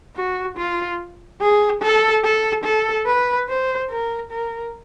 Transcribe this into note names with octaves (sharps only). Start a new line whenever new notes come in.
F#4
F4
G#4
A4
A4
A4
B4
C5
A#4
A#4